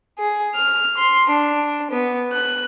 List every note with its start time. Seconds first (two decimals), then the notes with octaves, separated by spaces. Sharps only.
0.18 G#4
0.54 F6
0.96 C6
1.31 D4
1.91 B3
2.32 F#6